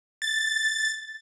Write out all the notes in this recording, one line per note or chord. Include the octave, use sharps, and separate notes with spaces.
A6